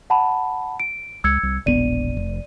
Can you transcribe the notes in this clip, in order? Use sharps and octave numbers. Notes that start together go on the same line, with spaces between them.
F#5 A5 B5
D7
C#2 E6 G#6 C#7
C2
E1 A#1 B3 D5 D#7
F1